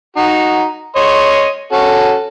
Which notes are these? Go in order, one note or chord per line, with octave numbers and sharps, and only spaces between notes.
D#4 F#4
C#5 D#5 C6
C#4 F#4 A4